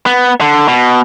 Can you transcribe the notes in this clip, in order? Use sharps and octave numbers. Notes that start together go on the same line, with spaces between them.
B3
D3
B2